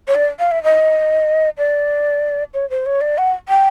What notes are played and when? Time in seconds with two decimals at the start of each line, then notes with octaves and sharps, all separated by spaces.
0.08 C#5
0.15 D5
0.39 F5
0.52 E5
0.64 D#5
1.58 D5
2.54 C#5
2.70 C5
2.86 C#5
3.01 D5
3.18 F#5
3.49 G5